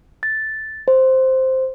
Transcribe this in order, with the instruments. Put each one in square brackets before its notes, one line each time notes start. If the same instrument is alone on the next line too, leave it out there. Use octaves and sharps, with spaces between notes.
[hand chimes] A6
C5